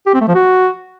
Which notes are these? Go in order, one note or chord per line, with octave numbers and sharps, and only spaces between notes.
G4
C4
A3
F3
F#4